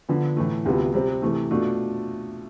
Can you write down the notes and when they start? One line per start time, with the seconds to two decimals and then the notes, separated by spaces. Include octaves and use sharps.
0.09 D3 F3 B3
0.37 A2 E3 A3
0.65 D2 C3 G3 B3 F4
0.94 C3 G3 C4
1.22 C3 E3 A3
1.51 B2 A3 D4 F4